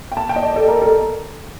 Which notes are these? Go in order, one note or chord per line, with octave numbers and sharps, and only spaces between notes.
G5
A5
G5
D#5
D5
A4
A#4
A4